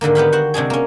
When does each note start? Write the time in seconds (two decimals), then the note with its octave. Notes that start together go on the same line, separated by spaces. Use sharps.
0.01 G#2 D3 D#3 A#3
0.15 B3 G4 F5 B5
0.33 F#4 C5 F#5
0.54 C3 G#3 D4 G#4
0.70 A#3 C#4